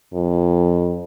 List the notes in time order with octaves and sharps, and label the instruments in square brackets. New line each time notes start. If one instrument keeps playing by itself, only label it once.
[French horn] F2